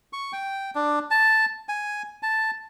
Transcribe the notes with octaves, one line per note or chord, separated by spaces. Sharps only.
C#6
G5
D4
A5
G#5
A5